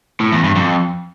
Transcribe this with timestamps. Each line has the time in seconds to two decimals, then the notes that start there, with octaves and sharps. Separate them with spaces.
0.20 A2
0.32 E2
0.44 G2
0.56 F2